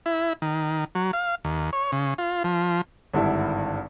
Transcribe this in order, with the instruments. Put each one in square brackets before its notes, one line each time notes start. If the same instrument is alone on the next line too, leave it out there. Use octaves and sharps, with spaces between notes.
[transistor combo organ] E4
D#3
F#3
F5
D#2
C#5
C#3
F4
F3
[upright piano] G#1 G2 D3 E4